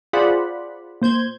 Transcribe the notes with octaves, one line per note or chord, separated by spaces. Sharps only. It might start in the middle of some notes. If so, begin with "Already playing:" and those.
F4 G#4 C5 D5 F#5 B5
A#2 C5 G6 G#6